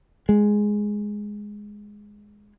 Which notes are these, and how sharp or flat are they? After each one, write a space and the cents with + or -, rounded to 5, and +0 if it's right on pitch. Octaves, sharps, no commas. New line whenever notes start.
G#3 +0